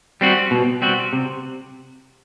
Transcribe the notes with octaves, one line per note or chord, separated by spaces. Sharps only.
G3 C4 F#4
B2
G3 C4 F#4
C3